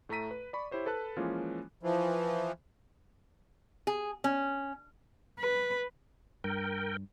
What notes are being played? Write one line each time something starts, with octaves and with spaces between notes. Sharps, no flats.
A2 A3 A4 A#5 B6 D#7
B4
D5 B5 C#6
E4 G4 C5 C#5
A4 B4 A5 F#6
E3 F3 G#3 A#3 C#4 F4
E3 F3
G#4
C#4
B4
G2 A#4 G5